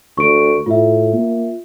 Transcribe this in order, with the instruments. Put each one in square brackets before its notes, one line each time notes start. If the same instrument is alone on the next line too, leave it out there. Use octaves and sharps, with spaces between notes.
[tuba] D2 [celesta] C#6 D7
[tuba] A2 [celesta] F4 E5
[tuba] A#3